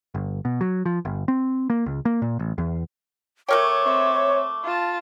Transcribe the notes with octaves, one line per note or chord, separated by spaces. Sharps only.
G1
B2
F#3
F3
G1
C4
A#3
C#2
A#3
A#2
A1
E2
A3 A#4 C#5 G5 D6
C4 E5
F4 A5